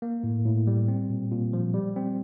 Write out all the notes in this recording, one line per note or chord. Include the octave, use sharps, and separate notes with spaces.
A#3
A2
A2
G3
C4
A#2
A#2
F3
G3
C4